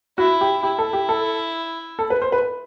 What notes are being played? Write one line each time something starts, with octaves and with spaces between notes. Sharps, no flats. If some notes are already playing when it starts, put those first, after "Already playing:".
E4 F#4
G4
E4 G4
A4
G4
A4
A4
B4
C5
B4